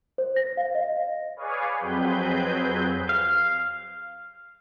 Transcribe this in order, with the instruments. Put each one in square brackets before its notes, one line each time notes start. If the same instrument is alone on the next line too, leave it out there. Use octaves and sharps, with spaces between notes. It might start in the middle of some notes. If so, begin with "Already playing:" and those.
[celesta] C5
A#6
F5
D#5
[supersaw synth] G#4 B4 C#5 D5 F5 G#5
F2 F#3 C4 G#4 B4 G6
[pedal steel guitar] F5